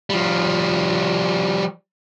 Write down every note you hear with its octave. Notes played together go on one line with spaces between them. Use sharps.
F3 G3